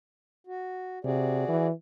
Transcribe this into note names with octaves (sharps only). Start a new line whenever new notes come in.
F#4
C3 F#4 G#4 D5
E3